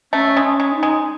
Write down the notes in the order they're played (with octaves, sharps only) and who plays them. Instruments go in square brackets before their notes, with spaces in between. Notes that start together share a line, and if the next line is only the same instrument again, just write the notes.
[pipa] A3 [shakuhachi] C#4
[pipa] G#3
[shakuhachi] C#4
[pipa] G#3
[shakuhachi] D#4
[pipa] G#3